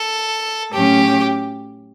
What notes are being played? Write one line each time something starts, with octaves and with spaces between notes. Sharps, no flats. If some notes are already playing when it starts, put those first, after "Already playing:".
Already playing: A4
A2 F#3 C#4 G4